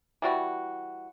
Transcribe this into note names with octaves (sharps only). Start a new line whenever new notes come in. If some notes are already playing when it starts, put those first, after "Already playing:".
E3 G3 F#4